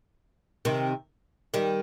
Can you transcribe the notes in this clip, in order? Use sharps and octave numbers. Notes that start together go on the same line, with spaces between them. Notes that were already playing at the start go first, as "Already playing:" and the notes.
C3 D#3
D#3 G3